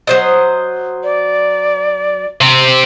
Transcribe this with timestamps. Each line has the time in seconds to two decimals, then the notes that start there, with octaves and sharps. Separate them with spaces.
0.07 F#3 C5 D#5
1.04 D5
2.41 C3 C4